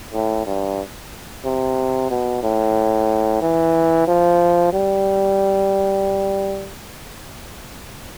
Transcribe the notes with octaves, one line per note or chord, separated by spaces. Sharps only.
A2
G2
C3
B2
A2
E3
F3
G3